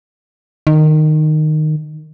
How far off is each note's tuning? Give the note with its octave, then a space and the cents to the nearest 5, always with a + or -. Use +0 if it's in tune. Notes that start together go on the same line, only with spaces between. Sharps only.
D#3 -15